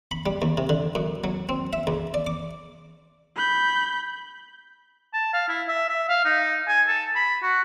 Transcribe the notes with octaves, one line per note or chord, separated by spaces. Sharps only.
B5
G3
D#2
C3
D3
F#2
F#3
C4
E5
C#2
D5
D6
B5 G6
A5
F5
E4
E5
E5
F5
D#4
G#5
A4
B5
F#4